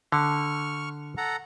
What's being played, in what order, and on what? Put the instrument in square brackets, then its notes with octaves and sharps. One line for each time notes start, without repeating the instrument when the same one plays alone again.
[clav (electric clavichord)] D3 [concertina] C#6 F6
[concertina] A4 F#5 A#5